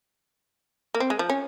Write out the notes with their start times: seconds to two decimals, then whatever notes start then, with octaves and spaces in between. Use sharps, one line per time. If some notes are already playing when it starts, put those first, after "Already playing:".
0.94 A#3
1.00 C4
1.10 G#3
1.19 F3
1.30 C#4